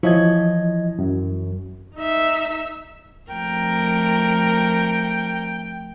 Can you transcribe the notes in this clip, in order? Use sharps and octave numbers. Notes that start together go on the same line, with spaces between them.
E3 F3 E4 C#5 D#5 G#6
F#2
D#4 E5
F2 A3 A#4 G5